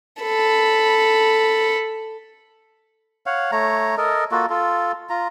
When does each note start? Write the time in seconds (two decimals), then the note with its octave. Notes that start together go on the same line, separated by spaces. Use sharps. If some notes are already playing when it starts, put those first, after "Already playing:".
0.22 A4 B5
3.26 C#5 F5 F#5
3.52 A3 C#5 A#5
3.97 A4 A#4 D#5
4.32 A#3 F4 F#4 A4
4.50 F4 A4
5.10 F4 A#5